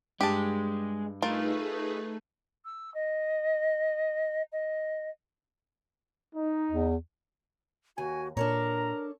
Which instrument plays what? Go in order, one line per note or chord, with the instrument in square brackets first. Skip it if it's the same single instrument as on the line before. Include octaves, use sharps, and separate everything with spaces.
[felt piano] G2 [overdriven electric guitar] G#3 [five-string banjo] G4 A5
[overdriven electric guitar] A3 [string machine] D#4 G#4 B4 [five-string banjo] F4 A#4
[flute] E6
D#5
D#5
[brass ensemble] D#4
[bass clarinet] E2
[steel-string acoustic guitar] D#2 [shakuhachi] F#4 [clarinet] G#5
[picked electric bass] A#2 [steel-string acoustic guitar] D4 A4 C#5 [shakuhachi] A#4 [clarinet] A#5